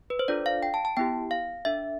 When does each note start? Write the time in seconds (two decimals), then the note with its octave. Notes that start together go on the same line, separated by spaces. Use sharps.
0.10 B4
0.19 C5
0.28 D4 F4 A4 D5
0.46 F5
0.63 G5
0.74 A5
0.85 A5
0.97 B3 E4 G4 G5
1.31 F5
1.65 D4 A4 E5